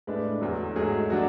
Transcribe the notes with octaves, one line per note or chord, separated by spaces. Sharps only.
A2 G#3 D4 B4
E2 D3 F#3
G#2 F#3 A3 G#4
F#3 A3 D4 F#4